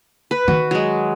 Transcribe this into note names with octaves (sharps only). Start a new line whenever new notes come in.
B4
D#3 F#4
F#3 G#3